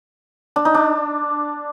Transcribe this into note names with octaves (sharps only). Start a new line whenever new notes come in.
D4
D#4
D4